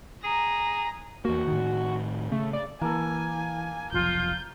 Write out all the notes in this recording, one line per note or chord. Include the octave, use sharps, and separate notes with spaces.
G#4 A#5
E2 A#3 F#4
A2 D#3
C#3 A3
D5
E3 A#3 A4 G#5
F1 B1 F3 F4 G6